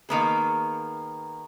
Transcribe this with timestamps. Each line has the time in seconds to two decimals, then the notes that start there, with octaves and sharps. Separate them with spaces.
0.09 D#3 A#3 B3 G#4